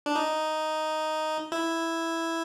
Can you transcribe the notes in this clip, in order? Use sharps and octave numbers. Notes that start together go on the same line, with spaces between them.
D4
D#4
E4